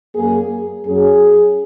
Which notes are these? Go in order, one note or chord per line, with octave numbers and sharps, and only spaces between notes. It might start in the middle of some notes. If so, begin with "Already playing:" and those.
F#2 F#3 A#3 G#4
F#2 F#3 C#4 G#4